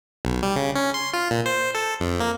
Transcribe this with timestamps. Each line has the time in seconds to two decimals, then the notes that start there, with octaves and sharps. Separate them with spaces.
0.25 B1
0.43 G3
0.56 C#3
0.75 C#4
0.94 C6
1.14 F4
1.31 A#2
1.46 C5
1.75 A4
2.00 F2
2.20 A#3